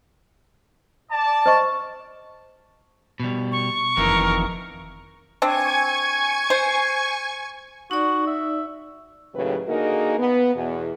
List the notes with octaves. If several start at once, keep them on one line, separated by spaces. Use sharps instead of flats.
D5 A5
C5 D#5 C#6
B2 G3
C#6
F#1 F2 D#3 E3 A#4
C4 D4 G#5 C#6 G#6
C5
D#4 F#4 D5
E5
D#2 A2 C#3 F#3 B4
D3 A#3 D#4 F#4 G#4 A#4
B3
E2 B2